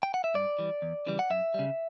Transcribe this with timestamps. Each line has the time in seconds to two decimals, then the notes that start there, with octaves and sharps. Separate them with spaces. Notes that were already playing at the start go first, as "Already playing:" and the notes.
0.03 G5
0.14 F#5
0.24 E5
0.34 G2 D5
0.59 E3 G3
0.82 E2
1.06 C#3 E3 G3
1.19 F#5
1.30 F#2 E5
1.54 C#3 G3